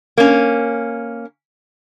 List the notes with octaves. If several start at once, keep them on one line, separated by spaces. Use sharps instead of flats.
A#3 C#4